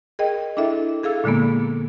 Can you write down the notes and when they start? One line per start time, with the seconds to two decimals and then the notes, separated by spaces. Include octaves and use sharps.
0.19 G#4 A#4 D#5 G5
0.57 D4 E4 A4 E5
1.03 G#4 A4 F5 E6
1.24 A#2 D3 G#3 A#3 B3